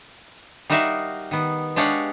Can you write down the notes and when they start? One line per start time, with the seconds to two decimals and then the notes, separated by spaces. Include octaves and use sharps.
0.70 G3 D#4 F#4 A#4 E5 F5
1.31 D#3 B3
1.76 G#3 D4 G4 C#5 F5 F#5